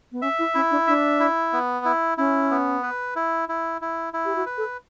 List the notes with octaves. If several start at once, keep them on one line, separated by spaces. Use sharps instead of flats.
B3
C#4 E5
E4
C#4 E4
D4
D4 E5
E4
B3
E4
C#4 E4
B3
B4
E4
E4
E4
E4
G4
F#4
B4
A4